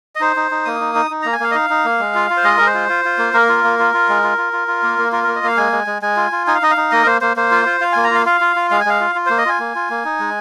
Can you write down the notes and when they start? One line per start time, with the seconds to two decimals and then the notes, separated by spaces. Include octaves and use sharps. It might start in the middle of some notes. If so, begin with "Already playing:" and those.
0.16 D#5
0.20 D#4 C5
0.36 D#4
0.51 D#4
0.65 A#3 D#6
0.80 D#4
0.95 D#4
1.11 D#4
1.22 A#3 A#5
1.33 G#5
1.40 A#3 F5
1.51 D#5
1.55 D#4 F5
1.70 D#4
1.85 A#3
2.00 G#3
2.15 F4
2.30 F4
2.37 C5
2.44 G#3 D#5
2.57 G#3 A#4
2.66 C5
2.74 F4
2.89 F4
3.05 F4
3.19 A#3
3.34 A#3 A#4
3.49 F4
3.64 A#3
3.79 F4
3.94 F4
4.09 G#3
4.24 F4
4.38 F4
4.53 F4
4.68 F4
4.83 A#3
4.98 A#3
5.12 F4 A#4
5.24 A#3 A#4
5.35 D#5
5.43 A#3 F5
5.57 G#3 G#5
5.72 G#3
5.87 G#3
6.02 G#3 G#5
6.17 F4
6.32 F4
6.47 D#4 G#5
6.55 F5
6.62 D#4 D#5
6.71 F5
6.77 D#4
6.91 A#3 D#5
7.03 A#4
7.06 A#3 C5
7.21 A#3 C5
7.36 A#3 C5
7.51 F4
7.66 F4
7.81 F4 F5
7.93 A#3 G#5
8.04 A#5
8.11 F4 F5
8.26 F4 F5
8.41 F4
8.56 F4
8.71 G#3 F5
8.80 G#5
8.86 G#3 F5
9.00 F4
9.15 F4
9.26 A#3 C5
9.38 D#5
9.46 F4 G#5
9.59 A#3
9.75 F4
9.90 A#3
10.05 D#4
10.20 G#3